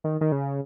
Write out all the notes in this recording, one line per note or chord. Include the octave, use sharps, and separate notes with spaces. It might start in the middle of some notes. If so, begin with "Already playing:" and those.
D#3
D#3
C#3